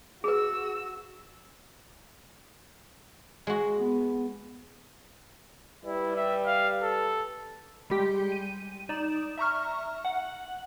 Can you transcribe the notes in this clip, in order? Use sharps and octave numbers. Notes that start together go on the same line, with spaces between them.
F#4 G#4 B4 E6
G#3 F#4
B3
G3 E4 B4
E5
F5
A4
G3 G#3 G4 G5
D#7
D#4 D5 E7
E5 A#5 C#6 F6
F#5